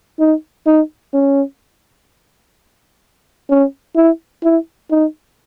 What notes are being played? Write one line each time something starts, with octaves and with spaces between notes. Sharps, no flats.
D#4
D#4
C#4
C#4
E4
E4
D#4